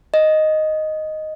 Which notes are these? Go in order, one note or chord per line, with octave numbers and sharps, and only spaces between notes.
D#5